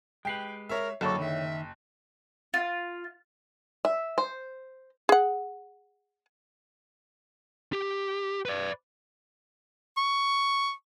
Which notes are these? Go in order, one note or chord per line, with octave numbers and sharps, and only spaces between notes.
G#3 G4 B4 G5 C7
A#4 C#5 E5
F#1 D3 F#3 E4 A4 C#5 A5
D#3 E5
F4
E5
C5
G#4 F#5
G4
B4 D5
C#6